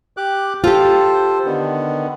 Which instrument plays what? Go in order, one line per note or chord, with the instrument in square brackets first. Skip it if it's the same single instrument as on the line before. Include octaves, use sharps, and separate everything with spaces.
[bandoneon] G4 D6 F#6
[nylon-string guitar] F4 G4 [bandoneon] A4 C5
[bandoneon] D3 D#3 B3